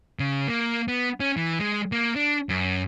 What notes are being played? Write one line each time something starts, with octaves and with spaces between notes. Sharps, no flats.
C#3
A#3
B3
C#4
E3
G#3
A#3
D4
F#2